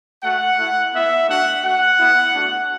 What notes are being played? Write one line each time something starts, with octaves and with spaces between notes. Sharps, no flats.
A3 F#4 F#5
A3 E4
B3 E4 E5
A3 D4 F#4 F#5
A3 F#4 F#5
B3 E4
A3 D4 F#4